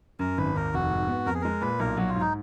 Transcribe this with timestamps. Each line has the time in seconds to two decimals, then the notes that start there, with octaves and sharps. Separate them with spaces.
0.19 F#2 A#4
0.38 G#1 B4
0.55 D#2 A#4
0.74 F1 F#4
0.90 G#2
1.08 B3
1.26 F2 A#4
1.35 G#4
1.41 G#3 A#4
1.61 A#2 B4
1.79 B1 A#4
1.97 F#3 F#4
2.09 F4
2.15 G#2
2.21 D#4